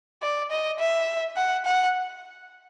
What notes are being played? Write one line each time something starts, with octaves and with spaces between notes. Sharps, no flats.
D5
D#5
E5
F#5
F#5